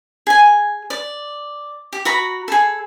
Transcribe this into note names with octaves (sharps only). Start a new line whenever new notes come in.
G#4 G#5
D5
G4
F#4 A#5 B5
G#4 A4